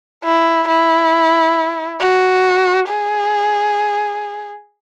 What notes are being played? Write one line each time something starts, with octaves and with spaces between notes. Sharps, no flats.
E4
E4
F#4
G#4